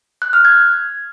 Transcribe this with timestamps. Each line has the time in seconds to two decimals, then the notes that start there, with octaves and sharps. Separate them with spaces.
0.22 F#6
0.33 F6
0.45 G#6